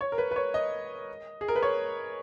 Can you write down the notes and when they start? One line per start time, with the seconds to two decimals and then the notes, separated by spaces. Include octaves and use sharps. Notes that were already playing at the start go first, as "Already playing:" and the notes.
0.01 C#5
0.12 A#4
0.18 B4
0.31 B4
0.36 C#5
0.54 D#5
1.41 G#4
1.48 A#4
1.56 B4
1.62 C#5